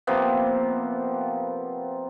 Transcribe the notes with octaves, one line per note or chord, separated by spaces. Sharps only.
C3 F3 A#3 B3